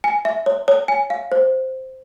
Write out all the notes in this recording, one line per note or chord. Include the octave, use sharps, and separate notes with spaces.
G#5
E5
C#5
C#5
G#5
F5
C5